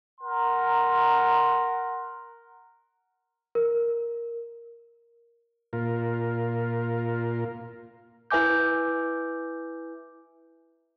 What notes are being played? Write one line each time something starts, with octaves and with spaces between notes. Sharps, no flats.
A#4 F#5 A#5 C6
A#4
A#2 F4 A#4
E4 B4 E5 G#5 D6 G6